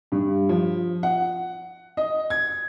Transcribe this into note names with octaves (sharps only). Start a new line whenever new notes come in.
G2
F3
F#5
D#5
G#6